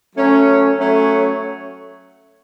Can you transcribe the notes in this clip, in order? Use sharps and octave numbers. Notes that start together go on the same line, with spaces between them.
F#3 A3 C#4
F#3 A3 C#4